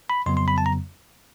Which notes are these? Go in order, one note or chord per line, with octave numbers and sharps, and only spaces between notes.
B5
F2 C#3 F#3 B3 C6
C6
B5
A5
A#5